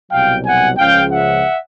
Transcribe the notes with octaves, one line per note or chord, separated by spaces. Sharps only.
C2 B2 F#3 F5 G5
F#5 G#5
C#2 C#3 F3 F5 G5
E5 F#5